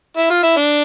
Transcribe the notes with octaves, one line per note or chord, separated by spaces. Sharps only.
E4
F4
E4
D4